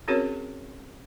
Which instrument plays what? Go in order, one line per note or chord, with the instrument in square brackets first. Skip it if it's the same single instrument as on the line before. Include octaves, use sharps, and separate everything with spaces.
[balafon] C4 C#4 F#4 G#4 A#4 C#5